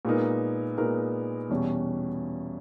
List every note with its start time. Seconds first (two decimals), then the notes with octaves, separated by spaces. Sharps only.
0.05 A#2 G#3 B3 D#4 A#4
0.77 A#2 G#3 B3 D#4 A#4
1.50 E2 B2 G3 C#4